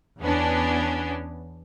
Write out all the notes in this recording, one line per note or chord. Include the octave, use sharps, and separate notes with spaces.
E2 B3 C#4 D4